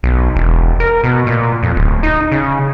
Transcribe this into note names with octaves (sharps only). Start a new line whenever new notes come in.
B1
E1
A#4
B2
A#2
F2
D1
D#4
C#3